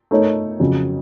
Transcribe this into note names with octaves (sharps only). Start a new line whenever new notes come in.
A3 D#4 A#4 C#5
F2 C#3 F#3